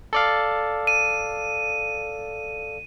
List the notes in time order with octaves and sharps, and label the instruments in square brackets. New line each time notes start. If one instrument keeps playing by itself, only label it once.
[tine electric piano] A4 D5 F5
[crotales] D#7